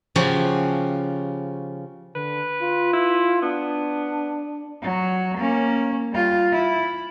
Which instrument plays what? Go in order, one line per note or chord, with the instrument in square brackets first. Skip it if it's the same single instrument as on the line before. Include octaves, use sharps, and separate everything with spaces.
[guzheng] C#3 F3 F#4 G4 G#5
[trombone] D3 [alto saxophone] B4
[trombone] F4
[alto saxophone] E4
[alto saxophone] B3 [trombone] D4
[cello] F#3
A#3 C#4
G3 F4
E4